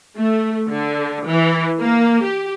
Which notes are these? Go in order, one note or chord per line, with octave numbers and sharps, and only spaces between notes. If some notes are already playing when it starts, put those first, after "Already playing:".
A3
D3
E3
A#3
G4